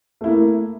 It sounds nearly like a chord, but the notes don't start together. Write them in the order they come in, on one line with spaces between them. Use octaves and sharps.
A3 E4 A#3